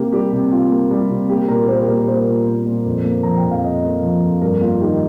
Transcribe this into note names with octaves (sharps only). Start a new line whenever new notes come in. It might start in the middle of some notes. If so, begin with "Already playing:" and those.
Already playing: C3 A#3 G4
G3 G4
C3
C3 F4
A#3
G3
C3
A#3 G4
A#2 A#4
A#3 C5
G4
A#2 A#4
A#3 C5
A#2
A#3
A#2
F2
A#3
F3 A#5
G5
F2
F5
F2 D#5
A#3
F3
F2
G2 A#4
A#3 F4
D#3 G4